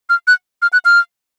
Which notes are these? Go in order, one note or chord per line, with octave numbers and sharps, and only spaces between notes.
F6
F#6
F6
F#6
F6